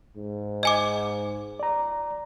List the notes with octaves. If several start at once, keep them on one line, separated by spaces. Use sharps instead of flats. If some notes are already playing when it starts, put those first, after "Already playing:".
G#2
D#5 G#5 D6
D5 A#5